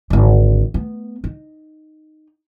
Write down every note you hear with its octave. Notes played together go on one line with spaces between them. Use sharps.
G#1 D3
A3 B3
D#4